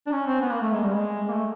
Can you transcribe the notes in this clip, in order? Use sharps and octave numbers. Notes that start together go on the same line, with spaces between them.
D4
C#4
C4
B3
A#3
A3
G#3
G3
G#3
A#3
A3